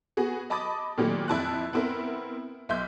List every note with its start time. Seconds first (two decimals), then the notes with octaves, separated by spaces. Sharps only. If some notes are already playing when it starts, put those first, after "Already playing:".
0.17 B3 F#4 G#4
0.50 D#5 A5 B5 D6 D#6 A6
0.98 A#2 D#3 F#3 A3 G4
1.28 F2 E4 A5 F#6
1.73 B3 C4 E4 A#4
2.69 B1 E5 C6 G6